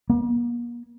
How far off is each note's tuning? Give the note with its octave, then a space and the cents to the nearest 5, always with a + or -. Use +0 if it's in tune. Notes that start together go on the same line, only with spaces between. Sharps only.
A#3 +40